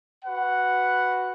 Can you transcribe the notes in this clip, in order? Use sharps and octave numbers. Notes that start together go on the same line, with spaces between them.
F#4 B4 F#5